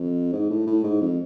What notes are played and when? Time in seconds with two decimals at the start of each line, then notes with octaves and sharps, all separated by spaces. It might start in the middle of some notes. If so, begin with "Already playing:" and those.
Already playing: F2
0.33 G#2
0.50 A2
0.67 A2
0.84 G#2
1.01 F2